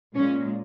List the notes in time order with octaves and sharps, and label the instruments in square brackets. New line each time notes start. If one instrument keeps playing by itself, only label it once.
[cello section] A#2 G#3 C#4